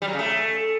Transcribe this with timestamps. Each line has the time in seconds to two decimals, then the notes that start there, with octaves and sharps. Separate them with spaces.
0.02 G3
0.07 F#3
0.13 C#3
0.19 A3